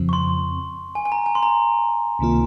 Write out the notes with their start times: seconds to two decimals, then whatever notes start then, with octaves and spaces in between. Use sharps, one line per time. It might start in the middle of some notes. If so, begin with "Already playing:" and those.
Already playing: F2 C#3 F3 C4
0.09 C#6
0.13 C6
0.95 G#5
1.05 G#5
1.12 A#5
1.26 G#5
1.35 C6
1.43 A#5
2.19 C#2 C3 D#3 A#3 F4